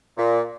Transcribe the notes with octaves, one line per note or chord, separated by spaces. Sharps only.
A#2